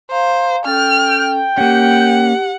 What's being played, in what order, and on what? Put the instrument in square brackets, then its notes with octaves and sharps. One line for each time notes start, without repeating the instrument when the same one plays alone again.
[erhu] C5 [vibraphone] F5 A#5
[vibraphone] C#4 A4 [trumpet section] G5 [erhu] F6
[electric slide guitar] A#3 C#4 [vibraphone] G4 [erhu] F#5